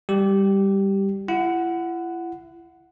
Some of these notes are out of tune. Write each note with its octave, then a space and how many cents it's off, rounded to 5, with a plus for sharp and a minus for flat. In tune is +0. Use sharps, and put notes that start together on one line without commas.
G3 +10 G4 -10
E4 +40 F#5 +0